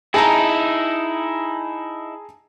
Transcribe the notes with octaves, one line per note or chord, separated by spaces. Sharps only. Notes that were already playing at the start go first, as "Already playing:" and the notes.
D#4 E4 G#4 A5 A#5